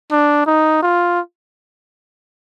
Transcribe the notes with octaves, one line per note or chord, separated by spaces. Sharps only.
D4
D#4
F4